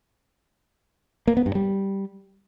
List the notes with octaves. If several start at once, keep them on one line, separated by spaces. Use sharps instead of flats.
A#3
B3
G2
G3